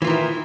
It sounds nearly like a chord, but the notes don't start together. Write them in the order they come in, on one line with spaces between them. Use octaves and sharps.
E3 F4 D#3 E4